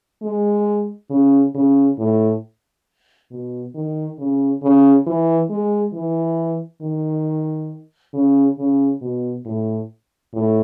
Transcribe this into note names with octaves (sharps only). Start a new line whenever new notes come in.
G#3
C#3
C#3
A2
B2
D#3
C#3
C#3
E3
G#3
E3
D#3
C#3
C#3
B2
A2
A2